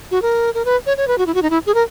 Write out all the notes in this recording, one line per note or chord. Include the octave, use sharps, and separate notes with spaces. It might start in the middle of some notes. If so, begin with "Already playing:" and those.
F#4
A#4
A#4
B4
C#5
C#5
B4
F#4
E4
F#4
D#4
E4
G#4
A#4